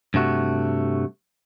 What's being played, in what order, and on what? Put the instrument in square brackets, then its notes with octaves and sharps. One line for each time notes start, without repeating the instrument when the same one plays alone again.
[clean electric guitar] G2 C3 A3 F#4